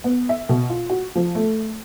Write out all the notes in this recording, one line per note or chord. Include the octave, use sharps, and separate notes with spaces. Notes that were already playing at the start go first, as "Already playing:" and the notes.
B3
E5
B2
F4
F#4
F3
A3